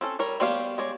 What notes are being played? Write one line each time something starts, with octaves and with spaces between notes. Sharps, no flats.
C4 C#4 A4
G3 A#4 C#5
G3 B3 G4 C5 C#5 F5
G#3 C#5 D5